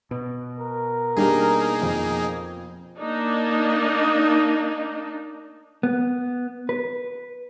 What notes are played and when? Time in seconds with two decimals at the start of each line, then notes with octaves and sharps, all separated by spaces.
0.11 B2
0.59 A#4
1.17 G3 A#3 D4 D#4 G4 G#4
1.82 F2
2.98 A#3 D4 D#4
5.83 B3
6.69 B4